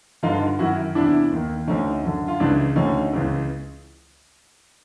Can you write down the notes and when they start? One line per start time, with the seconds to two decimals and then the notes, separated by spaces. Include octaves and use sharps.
0.23 G2 D3 D#4 F4
0.59 F#2 D#3 E4 F#4
0.95 E2 C3 E3 D4 E4
1.32 D#2 D#3
1.67 D2 D3 C#4 D#4
2.04 F#2 D3
2.28 F4
2.39 C#2 C#3 E3 D4 E4
2.76 D2 D3 C#4 D#4
3.13 C#2 C#3 E3